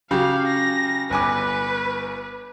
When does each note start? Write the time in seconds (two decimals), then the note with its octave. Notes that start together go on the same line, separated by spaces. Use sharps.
0.11 C#3 F#3 G4 F5
0.47 A#6
1.11 G1 B4 G#5 D6